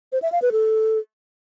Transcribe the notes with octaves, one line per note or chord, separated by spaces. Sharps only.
C5
E5
F5
B4
A4